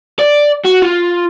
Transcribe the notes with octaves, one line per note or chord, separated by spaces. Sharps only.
D5
F#4
F4